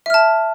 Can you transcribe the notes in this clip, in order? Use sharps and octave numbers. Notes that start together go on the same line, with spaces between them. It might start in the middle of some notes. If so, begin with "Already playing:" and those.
E5 A5 F6